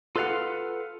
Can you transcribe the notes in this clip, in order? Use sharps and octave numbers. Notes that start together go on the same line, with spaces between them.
F4 A4 B4 D5 F5 F#5